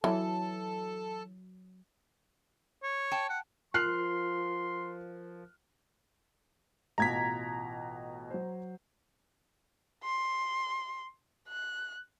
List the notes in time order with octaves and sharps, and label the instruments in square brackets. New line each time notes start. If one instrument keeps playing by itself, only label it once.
[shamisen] E3 [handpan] F#3 [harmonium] A4 A5
[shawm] C#5
[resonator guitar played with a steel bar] G5 A5
[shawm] F#5
[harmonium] F3 [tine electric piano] F4 A#4 [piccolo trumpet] C6 [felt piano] F6 F#6 C7
[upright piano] A1 B2 F4 [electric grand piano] A#5 G#6 B6
[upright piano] F#3 C5
[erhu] C6
F#6